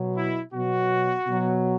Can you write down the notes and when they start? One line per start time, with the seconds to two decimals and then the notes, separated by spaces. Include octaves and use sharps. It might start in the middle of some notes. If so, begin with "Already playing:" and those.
Already playing: B2 F#3
0.17 E4
0.53 B2 F#3 F#4
1.27 B2 F#3